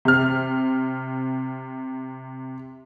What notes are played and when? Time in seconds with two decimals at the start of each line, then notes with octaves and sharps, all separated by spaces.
0.05 C3 F6